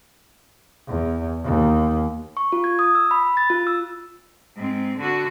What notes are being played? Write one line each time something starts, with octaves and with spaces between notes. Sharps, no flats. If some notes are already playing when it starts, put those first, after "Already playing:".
E2
D#2
C#6
F4
G#6
D#6
E6
B5
A6
F4
E6
G#2 C4
D3 F#4